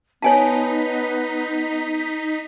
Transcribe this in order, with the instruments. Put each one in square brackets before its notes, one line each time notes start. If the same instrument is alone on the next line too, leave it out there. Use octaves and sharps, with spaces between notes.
[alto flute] B3 [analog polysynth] D#4 B6 [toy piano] C#5 G#5 A5